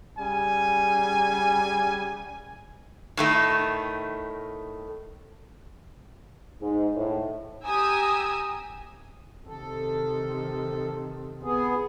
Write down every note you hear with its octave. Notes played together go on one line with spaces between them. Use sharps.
C#3 G3 G#5
A2 D#3 A3
G#2
A2
G4 G#5 A#5 D#6 E6
C3 D#3 A4
B3 G#4